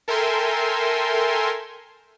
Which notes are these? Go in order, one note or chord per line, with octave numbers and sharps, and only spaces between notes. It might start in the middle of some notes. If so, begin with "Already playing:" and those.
A4 A#4 E5 G5 G#5 C6